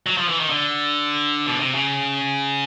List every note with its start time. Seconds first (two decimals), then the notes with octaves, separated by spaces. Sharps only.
0.06 F#3
0.18 F3
0.28 E3
0.40 D#3
0.50 D3
1.47 B2
1.60 C3
1.74 C#3